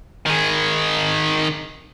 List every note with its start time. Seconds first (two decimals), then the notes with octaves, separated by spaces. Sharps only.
0.26 D#3 G#4